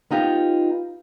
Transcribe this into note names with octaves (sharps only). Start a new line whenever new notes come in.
B3 D#4 F4 G4